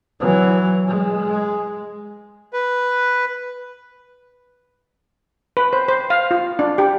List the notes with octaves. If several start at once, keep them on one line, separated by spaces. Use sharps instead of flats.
E3 F#3
G#3
B4
B4
C5
C5
F5
F4
D4
G4